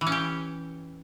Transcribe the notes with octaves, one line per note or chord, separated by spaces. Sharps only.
E3
C#4
G4